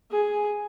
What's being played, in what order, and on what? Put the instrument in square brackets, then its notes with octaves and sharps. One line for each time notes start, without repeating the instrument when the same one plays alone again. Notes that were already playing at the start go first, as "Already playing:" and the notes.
[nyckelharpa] G#4